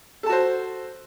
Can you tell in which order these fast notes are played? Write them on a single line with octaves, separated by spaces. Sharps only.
A4 A5 F#4 C5